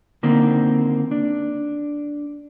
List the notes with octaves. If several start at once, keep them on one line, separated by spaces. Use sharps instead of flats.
D3 D#3 A#3 C4
D4